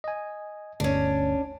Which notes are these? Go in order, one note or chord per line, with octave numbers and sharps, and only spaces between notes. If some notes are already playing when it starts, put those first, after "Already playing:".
D#5 G#5
G1 D2 C#4 D4